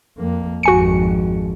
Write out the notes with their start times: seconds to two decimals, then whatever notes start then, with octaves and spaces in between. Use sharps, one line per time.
0.18 F2 A#3
0.63 G#1 F2 F#4 G#5 C#7